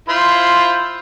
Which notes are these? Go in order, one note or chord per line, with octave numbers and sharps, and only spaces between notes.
E4 F4 C5